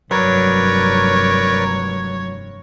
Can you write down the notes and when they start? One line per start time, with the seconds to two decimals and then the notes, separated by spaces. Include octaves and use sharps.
0.11 F1 G2 F#3 A#4 B4 C#5 D5